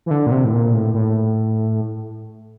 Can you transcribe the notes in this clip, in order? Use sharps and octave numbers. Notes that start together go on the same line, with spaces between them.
E3
D3
A#2
C3
A2
A#2
A2
A2